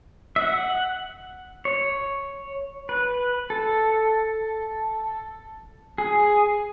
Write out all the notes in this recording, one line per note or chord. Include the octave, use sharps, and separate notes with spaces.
E5
F#5
C#5
B4
A4
G#4